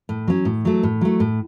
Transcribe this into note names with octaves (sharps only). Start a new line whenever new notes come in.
A2
F#3 C#4
A2
F#3 A3
A2
F#3 A3
A2